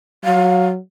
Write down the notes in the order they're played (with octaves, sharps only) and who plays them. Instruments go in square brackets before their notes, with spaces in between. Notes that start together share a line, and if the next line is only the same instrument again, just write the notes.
[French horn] F#3 [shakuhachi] F5